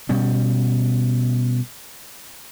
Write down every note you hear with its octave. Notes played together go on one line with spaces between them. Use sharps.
B2 G3 C#4